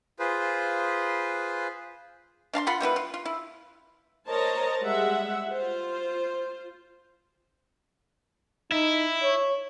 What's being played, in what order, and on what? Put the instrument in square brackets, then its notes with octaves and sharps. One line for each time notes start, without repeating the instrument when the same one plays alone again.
[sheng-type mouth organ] F4 G#4 B4 C5
[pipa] D4 F5 A5 C6
F4 F#5 B5 C6
G3 B3 E4 B4
F4
F4
E4
[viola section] A#4 C5 C#5 D#5 A5 A#5
G3 G#3 E5 F#5
F4 C5
[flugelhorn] D#4 [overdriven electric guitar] E4
[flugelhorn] C#5